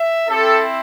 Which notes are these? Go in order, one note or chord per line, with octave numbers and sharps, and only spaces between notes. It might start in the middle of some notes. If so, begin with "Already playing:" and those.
Already playing: E5
C4 E4 G4 A4